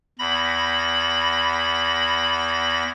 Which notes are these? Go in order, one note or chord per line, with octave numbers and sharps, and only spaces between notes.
E2 B5 A#6